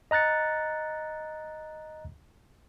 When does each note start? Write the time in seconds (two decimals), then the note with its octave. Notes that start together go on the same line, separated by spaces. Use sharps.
0.11 D#5 A#5 F#6 A6 C#7